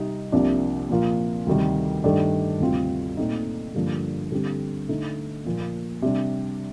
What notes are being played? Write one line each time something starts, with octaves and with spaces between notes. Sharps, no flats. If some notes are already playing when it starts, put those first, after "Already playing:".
Already playing: C3 G3 C4 D#4
C2 C3 F3 A#3 D4
A#2 F3 A#3 F4
D2 C3 D#3 G3
G2 D#3 A3 D4 A4
D2 C3 G3 C4 F4
A#2 A3 C4 D#4
G2 D3 F3 A#3 D4
D3 G3 C4 G4
D3 A3 D#4
A#2 F3 A#3
C3 G3 D4 G4